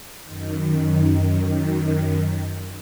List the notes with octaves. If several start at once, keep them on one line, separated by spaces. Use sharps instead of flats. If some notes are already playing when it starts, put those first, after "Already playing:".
F#2 D#3